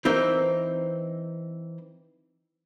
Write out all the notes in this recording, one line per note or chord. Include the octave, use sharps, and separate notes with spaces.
E3 C4 D#4 A#4